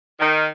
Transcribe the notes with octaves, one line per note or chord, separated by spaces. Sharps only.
D#3